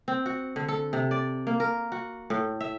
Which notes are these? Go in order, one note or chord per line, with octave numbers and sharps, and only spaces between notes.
C4
F#4
D3
A4
C3
D5
A#3
A#4
F#4
A2
E5